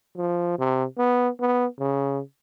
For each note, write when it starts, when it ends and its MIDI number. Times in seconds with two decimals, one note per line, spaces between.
0.17 0.57 53
0.59 0.85 48
0.98 1.29 59
1.40 1.66 59
1.79 2.20 49